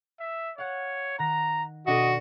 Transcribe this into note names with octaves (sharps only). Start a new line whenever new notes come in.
E5
C#5 F5 F#5
D#3 F#5 A#5 A#6
B2 D4 F#4 A4 D#5